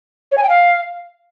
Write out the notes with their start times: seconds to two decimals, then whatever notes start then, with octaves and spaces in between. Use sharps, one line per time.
0.32 C#5
0.37 G#5
0.43 G5
0.49 F5